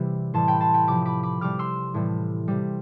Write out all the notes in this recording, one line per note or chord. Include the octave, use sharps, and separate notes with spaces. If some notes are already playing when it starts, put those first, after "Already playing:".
Already playing: C3 E3 G3
A2 E3 G3 A5 C6
G5 B5
A5 C6
G5 B5
C3 F3 B5 D6
B5 D6
B5 D6
C3 G3 D6 F6
C6 E6
A2 E3 G3
C3 G3